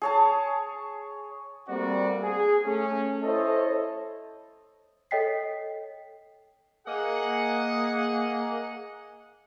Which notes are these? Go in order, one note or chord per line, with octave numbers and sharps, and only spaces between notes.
G#4 C#5 A5
G3 A3 A#3 C4 F#4 D5
G#4
A3 C#4
E4 A4 C5 C#5 D#5
A4 C#5 D#5 G5 B6 C7
A#3 G#4 D#5 F#5